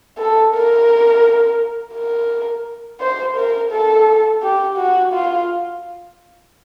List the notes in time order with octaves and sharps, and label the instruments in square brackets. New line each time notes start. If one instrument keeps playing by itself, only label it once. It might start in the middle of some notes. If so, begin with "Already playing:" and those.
[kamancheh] A4
A#4
A#4
C5
A#4
A4
G4
F#4
F4